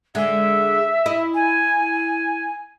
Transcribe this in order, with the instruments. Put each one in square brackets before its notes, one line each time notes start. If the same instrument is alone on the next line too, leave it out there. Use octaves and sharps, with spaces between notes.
[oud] D3 G#3 G#4 [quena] E5
[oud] E4 D#5
[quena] G#5